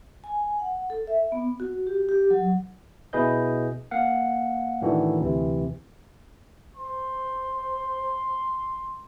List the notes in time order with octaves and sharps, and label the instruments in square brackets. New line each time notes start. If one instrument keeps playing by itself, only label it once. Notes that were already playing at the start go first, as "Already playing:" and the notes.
[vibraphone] G#5
F#5
A4
E5
B3
F#4
G4
G4
F#3
[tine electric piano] B2 E4 G#4 B4 D#5 G6
A#3 F5 F#5
A2 D#3 E3 D4 F#4 A4
D2 C3 E3
[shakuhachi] C5 [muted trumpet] C6